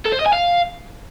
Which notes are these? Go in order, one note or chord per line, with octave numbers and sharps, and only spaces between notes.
A4
C5
D#5
G#5
F5